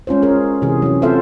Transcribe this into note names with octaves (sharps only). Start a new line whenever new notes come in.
G#3 C#4 F4 C5
C#4 G#4 A#4
C3 E3 G#4
F#3 C#4
C4 F4 A4 C5 E5 F5